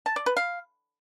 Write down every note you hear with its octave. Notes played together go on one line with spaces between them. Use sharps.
A5
D5
B4
F5